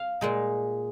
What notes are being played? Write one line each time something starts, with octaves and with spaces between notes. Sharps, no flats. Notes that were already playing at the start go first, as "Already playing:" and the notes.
Already playing: F5
A#2 G#3 D#4